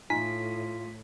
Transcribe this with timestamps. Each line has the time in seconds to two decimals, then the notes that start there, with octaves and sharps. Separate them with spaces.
0.10 A2 D#4 F4 G#5 B6